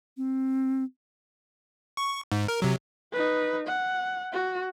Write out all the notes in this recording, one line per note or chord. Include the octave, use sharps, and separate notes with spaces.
C4
C#6
G#2
A#4
C3 F#3
D#4 B4
F#5
F#4